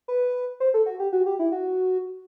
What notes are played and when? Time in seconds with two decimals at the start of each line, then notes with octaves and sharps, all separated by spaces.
0.08 B4
0.60 C5
0.74 A4
0.86 F#4
0.99 G4
1.13 F#4
1.26 G4
1.39 E4
1.52 F#4